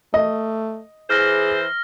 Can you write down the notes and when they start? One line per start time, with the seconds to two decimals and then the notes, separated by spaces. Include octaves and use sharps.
0.14 A3 D#5
1.10 E3 G#4 C5 F6 A#6